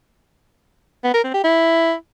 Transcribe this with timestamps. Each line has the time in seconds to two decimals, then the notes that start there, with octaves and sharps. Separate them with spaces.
1.04 B3
1.14 A#4
1.24 C4
1.34 G4
1.44 E4